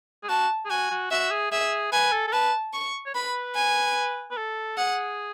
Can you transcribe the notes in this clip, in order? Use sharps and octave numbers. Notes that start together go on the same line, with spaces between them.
G#4
F#4 A5
G#4
F#4 G#5
F#4
F#4 E5
G#4
G#4 E5
B4 G#5
A4
A4
B4 A5
C#6
C#5
B4 B5
G#5
B4
A4
G#4 F#5